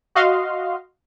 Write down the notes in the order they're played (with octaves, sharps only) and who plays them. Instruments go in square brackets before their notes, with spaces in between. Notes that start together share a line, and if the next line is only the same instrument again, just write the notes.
[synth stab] F#4 D#5 F5 C6